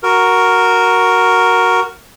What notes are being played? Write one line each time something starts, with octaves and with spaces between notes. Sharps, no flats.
F#4 A#4